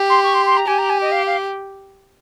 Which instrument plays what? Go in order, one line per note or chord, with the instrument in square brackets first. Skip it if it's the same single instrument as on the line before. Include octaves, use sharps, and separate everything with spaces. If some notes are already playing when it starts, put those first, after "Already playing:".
Already playing: [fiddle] G4
[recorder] C6
C#6
C6
C6
A#5
[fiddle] G4 [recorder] G#5
[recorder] A#5
G#5
D#5
F5
F5